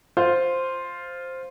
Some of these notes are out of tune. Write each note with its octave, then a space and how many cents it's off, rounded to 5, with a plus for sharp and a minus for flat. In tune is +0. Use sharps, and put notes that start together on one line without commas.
F4 +0 C5 +0